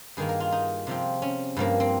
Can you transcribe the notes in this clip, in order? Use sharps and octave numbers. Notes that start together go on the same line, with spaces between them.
G2 D#3 A#3 G#4
A#4
F4
D#4
C3 F3 C4
C#4
G2 F3 A#3
C4